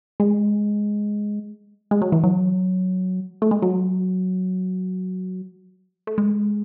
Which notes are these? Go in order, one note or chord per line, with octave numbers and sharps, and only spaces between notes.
G#3
G#3
F#3
E3
F#3
A3
G#3
F#3
A3
G#3